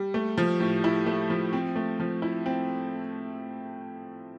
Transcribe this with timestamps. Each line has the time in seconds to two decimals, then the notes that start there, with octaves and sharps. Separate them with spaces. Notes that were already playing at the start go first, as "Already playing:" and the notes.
Already playing: G3
0.14 A3
0.38 F3
0.60 A2
0.84 E4
1.06 A3
1.30 F3
1.53 C4
1.76 A3
2.00 F3
2.22 E4
2.46 C4